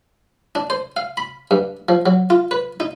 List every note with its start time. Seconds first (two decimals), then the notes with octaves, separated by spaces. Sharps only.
0.55 D4
0.70 C5
0.97 F5
1.17 B5
1.51 G2
1.89 F3
2.06 F#3
2.30 F4
2.51 B4
2.80 D#4